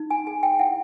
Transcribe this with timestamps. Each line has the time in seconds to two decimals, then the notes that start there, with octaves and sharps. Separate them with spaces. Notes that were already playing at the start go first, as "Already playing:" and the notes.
Already playing: D#4
0.10 G#5
0.27 G#4 G#5
0.43 G5
0.59 E4 F#5